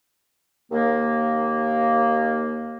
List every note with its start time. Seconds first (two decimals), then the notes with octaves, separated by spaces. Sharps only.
0.71 D#2 A#3